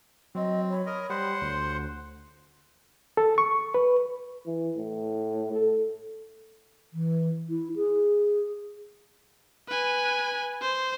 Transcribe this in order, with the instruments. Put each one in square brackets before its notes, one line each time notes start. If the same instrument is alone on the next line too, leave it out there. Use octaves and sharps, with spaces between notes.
[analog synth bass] F#3 [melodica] C4 [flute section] D#5
[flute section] C#5 B5
[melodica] A#4 D#5
[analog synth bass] G3 [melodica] C5 F#5
[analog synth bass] D2 [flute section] C6
[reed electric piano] A4
C#6
B4
[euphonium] E3
A2
A4
[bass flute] E3
E4
G#4
[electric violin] B4 G#5
C5